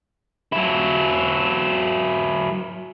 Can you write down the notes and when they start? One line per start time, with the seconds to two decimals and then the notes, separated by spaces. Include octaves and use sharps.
0.52 F#3 E4